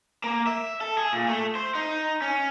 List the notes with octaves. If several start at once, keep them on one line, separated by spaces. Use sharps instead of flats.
A#3
E5
A4
G#4
A#2
A3
C5
D#4
C#4